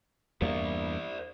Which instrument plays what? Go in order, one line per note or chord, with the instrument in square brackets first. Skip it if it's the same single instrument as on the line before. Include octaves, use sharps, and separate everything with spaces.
[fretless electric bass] E2 G2 A#3 [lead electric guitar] C5 D5